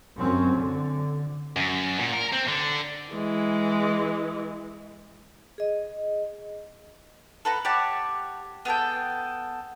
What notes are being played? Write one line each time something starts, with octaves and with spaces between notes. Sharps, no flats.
F#2 C4 C#4
D3
F#2
A#2
A#4
C4
D3
E3 G#3
G#4 D#5
A4 B4 F#5 A#5
G4 C#5 F#5 A5
B3 G#4 A4 G5